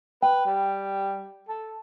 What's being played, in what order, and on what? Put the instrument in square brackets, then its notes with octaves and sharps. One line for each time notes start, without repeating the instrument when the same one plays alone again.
[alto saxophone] B4 [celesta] G5
[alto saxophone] G3
A4